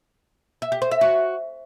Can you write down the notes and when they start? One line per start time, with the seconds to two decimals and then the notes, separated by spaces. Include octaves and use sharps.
0.62 E5
0.72 G4
0.82 C5
0.91 E5
1.01 F#4